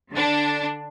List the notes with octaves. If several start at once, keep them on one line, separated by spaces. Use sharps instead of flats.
D3 D4